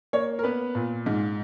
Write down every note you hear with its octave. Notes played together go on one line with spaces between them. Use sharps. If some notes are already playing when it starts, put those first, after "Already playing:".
A#3 C#5
A#4
B3 B4
A#2
G#2